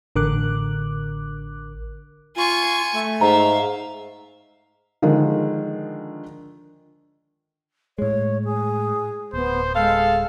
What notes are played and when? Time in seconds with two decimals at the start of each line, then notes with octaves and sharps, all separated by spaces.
0.16 A1 D3 A#4 D6 F#6
2.36 F4 G#5 C#6
2.92 A3
3.21 G#2 E5 F5 A#5
5.02 D3 D#3 F3 G#3
7.98 A2 G#3 C#5
8.44 G#4
9.34 D1 B3 C5
9.75 G#3 A4 F5